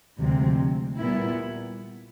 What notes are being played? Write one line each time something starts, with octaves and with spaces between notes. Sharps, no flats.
D2 C3 F3 G#3 C4
A#2 G3 B3 E4